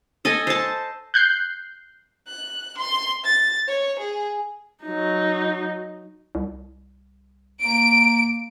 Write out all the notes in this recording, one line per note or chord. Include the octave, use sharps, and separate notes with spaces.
A4 D#5 G#5
C5 A5
F#6 G6 C7
F#6
C6
A6
C#5
G#4
F#3 D#4
C2
A#3 D7